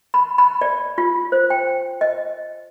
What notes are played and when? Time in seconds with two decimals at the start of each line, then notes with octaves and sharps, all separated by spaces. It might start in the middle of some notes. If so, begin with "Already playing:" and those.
0.14 B5
0.38 B5
0.61 D5
0.98 F4
1.32 C5
1.50 G5
2.01 D#5